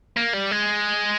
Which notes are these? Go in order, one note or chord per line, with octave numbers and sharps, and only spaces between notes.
A#3
G3
G#3